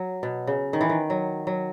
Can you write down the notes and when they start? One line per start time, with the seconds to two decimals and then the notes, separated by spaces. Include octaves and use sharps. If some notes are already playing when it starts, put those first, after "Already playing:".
Already playing: F#3
0.23 B2
0.47 C#3
0.73 D#3
0.81 E3
0.89 D#3
1.10 F#3
1.47 F#3